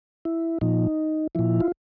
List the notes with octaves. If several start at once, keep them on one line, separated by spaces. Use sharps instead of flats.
E4
A#2 F3 D#4
A#2 F3 E4
F4